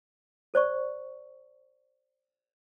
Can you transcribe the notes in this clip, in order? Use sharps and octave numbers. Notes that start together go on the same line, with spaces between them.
A4 C5 D5 C#6